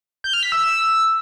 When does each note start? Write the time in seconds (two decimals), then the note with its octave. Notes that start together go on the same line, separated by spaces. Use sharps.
0.24 G6
0.33 F6
0.43 B6
0.52 E6